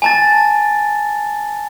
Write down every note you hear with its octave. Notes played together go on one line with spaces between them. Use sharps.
G#5 A5 A6